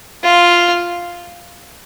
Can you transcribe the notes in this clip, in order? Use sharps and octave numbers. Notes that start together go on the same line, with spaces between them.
F4